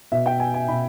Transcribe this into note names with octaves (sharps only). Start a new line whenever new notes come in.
B2 E5
G5
G#5
G#5
B2 B5